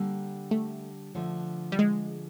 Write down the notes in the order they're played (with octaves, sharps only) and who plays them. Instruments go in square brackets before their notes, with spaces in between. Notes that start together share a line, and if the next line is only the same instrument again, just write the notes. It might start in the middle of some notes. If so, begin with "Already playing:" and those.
Already playing: [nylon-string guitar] D3 G3 A#3
[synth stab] A3
[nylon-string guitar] D3 F3 A3
[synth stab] G3
G#3